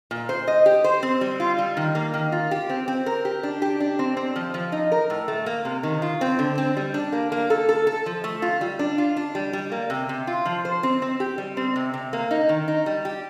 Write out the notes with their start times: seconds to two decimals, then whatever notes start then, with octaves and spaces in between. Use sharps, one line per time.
0.11 A#2
0.29 C5
0.48 D#5
0.66 G4
0.84 C5
1.03 C4
1.21 G3
1.40 F4
1.58 G3
1.77 D#3
1.95 A#3
2.14 D#3
2.32 F4
2.51 G4
2.69 C4
2.88 C4
3.06 A#4
3.25 G4
3.43 D4
3.62 G4
3.80 D4
3.99 C4
4.17 C4
4.36 F3
4.54 F3
4.72 D#4
4.92 A#4
5.10 A2
5.28 A3
5.46 A#3
5.65 C3
5.83 D#3
6.02 F4
6.21 C4
6.39 D3
6.58 C4
6.77 G3
6.94 D4
7.12 A#3
7.32 A#3
7.50 A4
7.69 A4
7.87 A4
8.06 F3
8.24 A3
8.42 F4
8.61 G3
8.79 D4
8.98 F4
9.17 D4
9.35 G3
9.53 G3
9.72 A#3
9.90 C3
10.09 C3
10.27 F4
10.45 F3
10.65 C5
10.83 C4
11.02 C4
11.20 G4
11.38 G3
11.57 C4
11.76 C3
11.94 C3
12.13 A#3
12.31 D#4
12.49 D#3
12.68 D#4
12.86 G3
13.05 G4